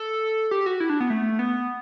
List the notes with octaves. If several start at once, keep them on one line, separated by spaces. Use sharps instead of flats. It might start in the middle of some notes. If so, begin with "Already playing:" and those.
Already playing: A4
G4
F#4
E4
D4
B3
A3
B3